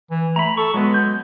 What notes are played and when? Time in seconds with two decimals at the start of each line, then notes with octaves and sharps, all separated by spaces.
0.11 E3
0.36 A3 A#5 B5
0.57 A4 C#6
0.74 F#3 G#3 B3
0.94 G6